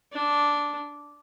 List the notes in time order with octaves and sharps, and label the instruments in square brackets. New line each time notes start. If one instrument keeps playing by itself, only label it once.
[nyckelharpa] D4